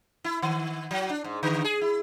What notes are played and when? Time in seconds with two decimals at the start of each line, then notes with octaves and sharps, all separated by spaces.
0.24 E4
0.42 D#3
0.91 F#3
1.10 D4
1.24 G#2
1.43 D3
1.64 G#4
1.81 E4